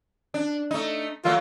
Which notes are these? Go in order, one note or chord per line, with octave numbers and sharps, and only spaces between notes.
D4
A3 D#4
F#3 A3 A#3 F4